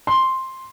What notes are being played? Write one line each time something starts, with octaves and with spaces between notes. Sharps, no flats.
C6